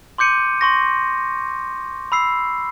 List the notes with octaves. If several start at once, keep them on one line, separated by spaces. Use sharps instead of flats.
C6 D6 G6 C#7 D#7
C6 C#6 A#6
B5 E6 C7